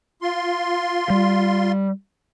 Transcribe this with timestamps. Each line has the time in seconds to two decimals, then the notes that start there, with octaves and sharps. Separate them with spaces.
0.22 F4 C6
1.10 G3